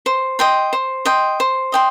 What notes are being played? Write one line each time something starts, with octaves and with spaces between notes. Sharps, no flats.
C5
D#5 G5 C6
C5
D#5 G5 C6
C5
D#5 G5 C6